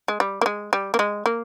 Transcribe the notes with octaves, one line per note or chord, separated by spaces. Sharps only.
G#3
G3
A#3
G#3
G3
A#3
G#3
A#3